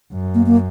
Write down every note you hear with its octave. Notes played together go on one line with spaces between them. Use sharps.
F#2
A#3
A#3